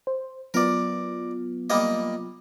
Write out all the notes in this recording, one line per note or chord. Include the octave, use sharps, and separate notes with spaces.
C5
F#3 B3 F4 A#4 D5
G3 A#3 D#5